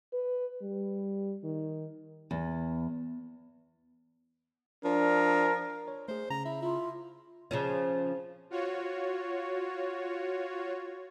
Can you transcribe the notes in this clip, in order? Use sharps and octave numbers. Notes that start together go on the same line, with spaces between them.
B4
G3
D#3
E2
F3 D4 A#4
C#5
A3 G#4 C5
C#3 A#5
E4
E4 F4
C#3 F3 C#4
F4 F#4 C#5